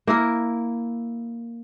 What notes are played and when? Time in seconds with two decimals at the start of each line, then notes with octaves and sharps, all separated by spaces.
0.07 A#3 E4 A#4